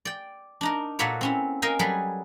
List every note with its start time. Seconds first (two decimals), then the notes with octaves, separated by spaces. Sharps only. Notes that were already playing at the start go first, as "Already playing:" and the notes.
0.05 D5 G5
0.61 D4 D#4 A#4
0.99 A#2 A#3 F#4 A4 B4 C#5
1.21 C4 C#4 E4
1.62 A#4 D#5 F5 G5 G#5
1.79 F#3 G3 G#4 A4 B4